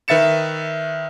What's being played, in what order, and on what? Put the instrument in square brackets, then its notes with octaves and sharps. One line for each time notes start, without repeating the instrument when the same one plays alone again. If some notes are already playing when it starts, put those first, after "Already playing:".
[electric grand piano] D#3 B4 E5 A6 C#7 E7